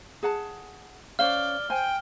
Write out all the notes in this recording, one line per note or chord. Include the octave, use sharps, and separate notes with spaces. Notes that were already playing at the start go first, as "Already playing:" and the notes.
G#4 F#5 A5
C#4 C5 D5 F5 F6 G7
C5 G5 G#5